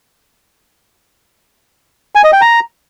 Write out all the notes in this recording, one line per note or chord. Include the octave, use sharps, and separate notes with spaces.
G#5
D#5
G5
A#5